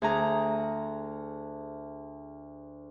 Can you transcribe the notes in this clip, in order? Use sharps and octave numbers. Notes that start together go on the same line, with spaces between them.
D2 G#4 A#5